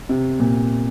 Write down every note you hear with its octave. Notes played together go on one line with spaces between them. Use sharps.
C3
A#2